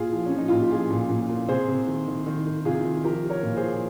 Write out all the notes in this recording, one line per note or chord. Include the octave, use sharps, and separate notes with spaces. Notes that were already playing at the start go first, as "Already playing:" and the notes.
Already playing: A#2 F4 G#4
F3
C#4
F3
D#4
A#2 F4
G4
F3 F4 G#4
A#2
A#2
A#2
C3 G#4 C5
C3
D#3
D#3
D#3
D#3
C3 F4 G#4
D#3
F3 G4 A#4
F3
A#4 C#5
A#2
G#4 C5
F3